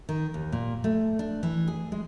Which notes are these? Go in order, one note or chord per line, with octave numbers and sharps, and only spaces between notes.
D#3
D#2
A#2
A3
D4
E3
G#4
G#3